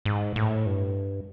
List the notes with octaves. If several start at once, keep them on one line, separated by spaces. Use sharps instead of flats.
G#2
A2
G2